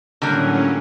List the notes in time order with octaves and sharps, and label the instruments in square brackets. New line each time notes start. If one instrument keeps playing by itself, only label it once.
[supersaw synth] A2 F#3 C#4 [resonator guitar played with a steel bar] D3 G3 A#3